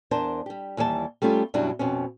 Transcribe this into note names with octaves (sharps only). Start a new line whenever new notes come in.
E2 D4 A#4 C5 A5
G3 G4
D#2 E3 G3 D5 A5
G3 A3 C#4 F4 G4
F#2 B2 F#3 G3 D4 E4
F2 B2 C4 C#4